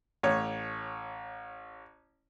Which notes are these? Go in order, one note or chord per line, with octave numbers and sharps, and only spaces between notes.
A1 C#5